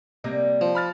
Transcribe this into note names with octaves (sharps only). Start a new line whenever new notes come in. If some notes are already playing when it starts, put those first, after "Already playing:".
C3 G3 A#3 D#5
F3
B5 F6 A6